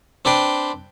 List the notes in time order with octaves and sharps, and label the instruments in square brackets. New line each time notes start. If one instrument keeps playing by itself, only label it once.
[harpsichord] C4 D4 B4 G5 C6